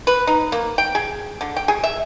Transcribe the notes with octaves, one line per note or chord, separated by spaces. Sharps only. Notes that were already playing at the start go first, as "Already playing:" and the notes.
B4
D#4
A#3
G5
G#4
D3
G5
G#4
E5